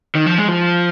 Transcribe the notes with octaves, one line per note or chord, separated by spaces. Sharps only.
D#3
F3
G#3
F3